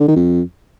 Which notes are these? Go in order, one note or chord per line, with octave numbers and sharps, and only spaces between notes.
D3
D#3
F2